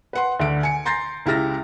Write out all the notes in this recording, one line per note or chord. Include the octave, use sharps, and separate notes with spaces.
B4 F#5 C6
D2 D3 D7
G#5 C#7
A#5 C6 G6 A6 A#6 C7
C#2 E4 G4 F6 A6 A#6